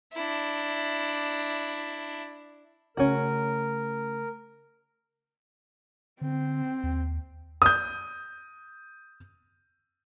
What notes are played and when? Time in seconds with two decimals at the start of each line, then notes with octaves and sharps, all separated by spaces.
0.13 D4 E4
2.97 C#3 A3 C#4 F#4 A#4
6.21 D3 C4
6.83 D#2
7.62 D#6 G6